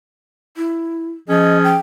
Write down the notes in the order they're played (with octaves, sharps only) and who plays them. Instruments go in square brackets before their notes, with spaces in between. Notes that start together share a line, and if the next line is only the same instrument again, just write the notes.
[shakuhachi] E4
[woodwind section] F3 C#4 G#4 [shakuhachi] D#5
[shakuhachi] G5